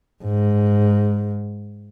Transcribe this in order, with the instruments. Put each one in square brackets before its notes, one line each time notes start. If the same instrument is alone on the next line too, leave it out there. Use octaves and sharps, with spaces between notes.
[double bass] G#2